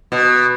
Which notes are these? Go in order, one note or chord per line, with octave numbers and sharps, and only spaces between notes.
B2